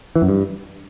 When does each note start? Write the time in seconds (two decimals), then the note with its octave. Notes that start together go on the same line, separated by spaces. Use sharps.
0.16 E3
0.22 F#2
0.29 G2